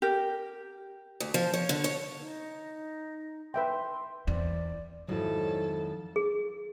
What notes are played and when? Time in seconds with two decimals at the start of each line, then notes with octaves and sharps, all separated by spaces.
0.02 G4 A#4
1.20 D2
1.34 F3
1.54 C#5
1.69 D3
1.84 C#5
2.20 D#4
3.54 B4 E5 G5 C6
4.27 E2 C4 D5
5.09 G#1 F2 F#3 G#3 E4 A4
6.16 G#4